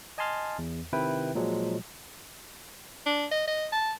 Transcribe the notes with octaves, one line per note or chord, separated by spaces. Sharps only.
D#5 G#5 A5 C6 F6 A6
E2
C3 D#3 E4 B4 G5
A#2 F3 F#3 G#3
D4
D#5
D#5
A5